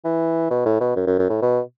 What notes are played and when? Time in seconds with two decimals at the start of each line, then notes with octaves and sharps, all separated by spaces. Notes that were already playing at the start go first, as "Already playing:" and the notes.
0.05 E3
0.51 B2
0.66 A2
0.81 B2
0.96 F#2
1.07 F#2
1.19 F#2
1.30 A2
1.42 B2